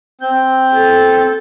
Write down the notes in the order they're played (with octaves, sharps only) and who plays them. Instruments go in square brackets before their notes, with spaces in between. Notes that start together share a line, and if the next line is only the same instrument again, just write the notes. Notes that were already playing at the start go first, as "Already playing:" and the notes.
[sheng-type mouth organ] C4 G6
[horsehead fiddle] A4